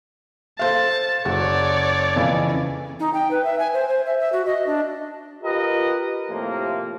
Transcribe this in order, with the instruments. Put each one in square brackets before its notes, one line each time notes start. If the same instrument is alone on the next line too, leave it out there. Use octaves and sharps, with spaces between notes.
[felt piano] A4 C5 F5 [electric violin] A5
[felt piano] F#1 F#3 F#4 [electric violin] C#5 D5
[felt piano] F2 C#3 E3
[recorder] D#4
G5
B4
E5
G#5
C5
C5
E5
E5
F#4
D#5
D4
[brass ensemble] F4 G4 A#4 B4 D#5
A2 C3 F3 A#3